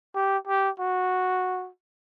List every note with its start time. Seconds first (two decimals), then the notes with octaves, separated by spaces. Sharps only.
0.15 G4
0.47 G4
0.80 F#4